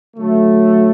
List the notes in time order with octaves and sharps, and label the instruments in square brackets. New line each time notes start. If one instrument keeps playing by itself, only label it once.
[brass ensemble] D3 F#3 A3